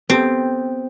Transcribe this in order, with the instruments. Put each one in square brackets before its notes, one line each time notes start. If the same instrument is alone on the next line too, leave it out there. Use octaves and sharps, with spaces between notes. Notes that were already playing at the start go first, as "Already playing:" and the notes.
[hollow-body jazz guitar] B3 G4 A4 [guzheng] C4